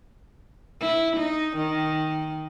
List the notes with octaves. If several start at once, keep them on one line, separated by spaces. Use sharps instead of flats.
E4
D#4
D#3